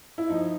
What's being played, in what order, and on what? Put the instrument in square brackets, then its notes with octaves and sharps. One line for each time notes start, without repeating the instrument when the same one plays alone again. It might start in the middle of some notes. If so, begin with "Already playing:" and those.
[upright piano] E4
F3 D#4